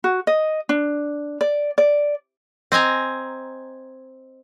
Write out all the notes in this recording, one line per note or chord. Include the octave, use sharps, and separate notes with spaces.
F#4
D#5
D4
D5
D5
C4 D#5 G#5 A#5